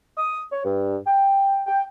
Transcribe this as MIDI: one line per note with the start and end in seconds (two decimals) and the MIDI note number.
0.17 0.42 87
0.52 0.61 73
0.64 0.97 43
1.07 1.60 79
1.67 1.84 79